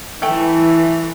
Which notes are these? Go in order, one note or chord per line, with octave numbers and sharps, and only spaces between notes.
E3 A3 G5